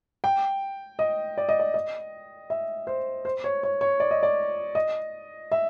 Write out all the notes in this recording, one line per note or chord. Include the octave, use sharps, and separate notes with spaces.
G5
D#5
D5
D#5
D5
D#5
E5
C5
C5
C#5
C#5
C#5
D5
D#5
D5
D#5
E5